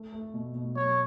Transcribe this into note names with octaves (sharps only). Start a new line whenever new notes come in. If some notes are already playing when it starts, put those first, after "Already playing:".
Already playing: A3
A3
B2
B2
F#3 C#5